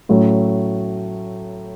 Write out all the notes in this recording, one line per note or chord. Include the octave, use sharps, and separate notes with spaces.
A2 F#3 A3 C#4